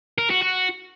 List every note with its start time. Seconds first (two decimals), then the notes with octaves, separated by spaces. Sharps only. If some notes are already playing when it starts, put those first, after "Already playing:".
0.18 A#4
0.30 F#4
0.42 F#4